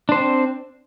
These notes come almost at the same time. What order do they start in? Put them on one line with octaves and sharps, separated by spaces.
D4 C5 C4